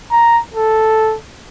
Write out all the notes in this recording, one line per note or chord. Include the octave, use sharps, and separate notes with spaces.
A#5
A4